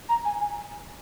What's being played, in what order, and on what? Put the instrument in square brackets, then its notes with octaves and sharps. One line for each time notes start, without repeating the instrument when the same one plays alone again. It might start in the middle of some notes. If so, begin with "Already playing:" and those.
[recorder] A#5
G#5
G#5